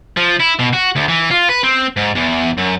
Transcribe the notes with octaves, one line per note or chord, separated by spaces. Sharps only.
F3
E4
B2
F#4
D2
E3
F4
B4
C4
G#2
E2
F#2